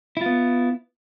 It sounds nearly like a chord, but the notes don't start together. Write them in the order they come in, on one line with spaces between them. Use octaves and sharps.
E4 F4 B3